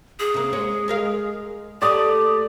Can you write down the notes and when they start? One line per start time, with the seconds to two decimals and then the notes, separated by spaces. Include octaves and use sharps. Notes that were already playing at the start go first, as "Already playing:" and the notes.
0.19 G#4
0.34 C3 A#3
0.53 G#3 C#5
0.88 G#3 A#4 F5
1.82 A#2 A3 G4 D5 D#6